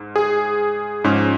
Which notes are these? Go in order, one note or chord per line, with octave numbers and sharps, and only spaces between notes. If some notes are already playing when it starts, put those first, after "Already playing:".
Already playing: G#2
G#4
G#2 F3 C#4